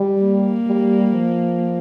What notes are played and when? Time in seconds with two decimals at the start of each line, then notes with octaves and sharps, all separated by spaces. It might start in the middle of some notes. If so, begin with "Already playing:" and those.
Already playing: G3
0.22 A#3
0.67 G3
1.11 F3